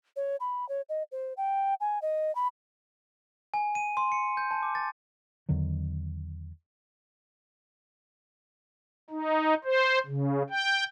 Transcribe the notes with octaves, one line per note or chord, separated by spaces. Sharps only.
C#5
B5
C#5
D#5
C5
G5
G#5
D#5
B5
G#5
D#7
C6
C#7
G6
A5
D6
A6
E2 D3 D#3 F#3
D#4
C5
C#3
G5